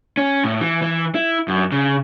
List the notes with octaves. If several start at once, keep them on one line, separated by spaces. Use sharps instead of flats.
C#4
A2
E3
E3
E4
F#2
C#3